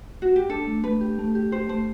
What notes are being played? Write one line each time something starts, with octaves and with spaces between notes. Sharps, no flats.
F#4
G4
D4 A4
A3
A3 B4
G4
A3
G4
G4 C5
A3 C5